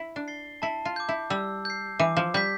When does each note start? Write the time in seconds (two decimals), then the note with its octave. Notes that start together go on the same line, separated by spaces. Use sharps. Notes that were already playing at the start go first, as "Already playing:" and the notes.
Already playing: E4
0.16 D4
0.28 A6 C7 G7
0.62 E4 A5
0.85 F4
0.96 D6 G6
1.09 E4
1.30 G3 E6
1.65 G6 C7
1.99 E3 D6
2.17 F3
2.34 G3 G6 B6